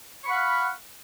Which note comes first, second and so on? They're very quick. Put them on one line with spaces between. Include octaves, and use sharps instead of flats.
C#6 B5 F#5 F5